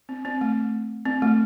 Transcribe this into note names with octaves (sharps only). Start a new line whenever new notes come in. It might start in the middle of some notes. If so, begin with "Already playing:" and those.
C4
C4
A3
C4
A3